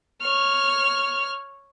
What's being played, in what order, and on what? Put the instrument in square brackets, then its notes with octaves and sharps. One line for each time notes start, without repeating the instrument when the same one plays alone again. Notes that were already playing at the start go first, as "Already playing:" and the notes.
[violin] C#5 F6